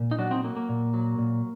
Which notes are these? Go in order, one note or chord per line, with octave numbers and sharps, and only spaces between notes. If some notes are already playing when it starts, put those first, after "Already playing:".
Already playing: A#2
D#4
F#3 D4 F#4
C4 D#4
F#3 A#3
A#3
A#2
F#3
A#2